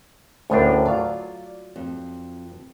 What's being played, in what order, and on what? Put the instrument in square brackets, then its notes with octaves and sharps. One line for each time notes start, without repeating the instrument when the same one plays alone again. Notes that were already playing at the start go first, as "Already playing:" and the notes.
[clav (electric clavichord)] D2 A2 D4 [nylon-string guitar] A3 C#4 A#4
[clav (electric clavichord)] F#3 F4 F5 [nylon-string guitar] D5
[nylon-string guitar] F2